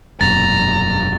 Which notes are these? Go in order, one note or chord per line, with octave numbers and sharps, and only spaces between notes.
E1 F#2 A#2 A#5 A6